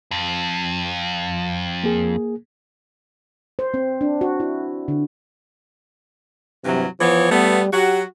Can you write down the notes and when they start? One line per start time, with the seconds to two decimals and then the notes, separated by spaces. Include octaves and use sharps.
0.11 F2
1.84 A#3 G#4
3.59 C5
3.74 C4
4.01 D4
4.21 F#4
4.40 E4
4.88 D3
6.64 G2 C3 E3 F#3
7.00 E3 F3 B3 C#5
7.31 G3 A3 B3
7.73 F#3 F#4 G4